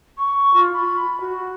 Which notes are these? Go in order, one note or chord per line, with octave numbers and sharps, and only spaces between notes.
C#6
F4
B5
F#4